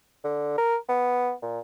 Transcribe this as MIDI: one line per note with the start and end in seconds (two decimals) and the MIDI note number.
0.24 0.57 50
0.58 0.76 70
0.89 1.33 59
1.42 1.59 46